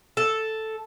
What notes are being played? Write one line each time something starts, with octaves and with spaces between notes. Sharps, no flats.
A4